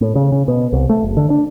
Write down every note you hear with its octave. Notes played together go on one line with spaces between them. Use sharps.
A2
C#3
C#3
B2
C2
A3
F#1
D3
D4